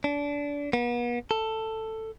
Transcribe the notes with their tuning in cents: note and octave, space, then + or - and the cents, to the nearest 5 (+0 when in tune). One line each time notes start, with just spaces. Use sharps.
D4 -25
B3 -40
A4 +10